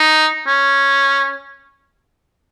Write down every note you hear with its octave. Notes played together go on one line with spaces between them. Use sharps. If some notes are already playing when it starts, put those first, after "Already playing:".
Already playing: D#4
C#4